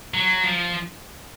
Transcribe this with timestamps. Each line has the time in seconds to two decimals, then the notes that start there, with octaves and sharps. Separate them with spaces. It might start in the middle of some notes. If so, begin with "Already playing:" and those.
0.14 F#3
0.43 F3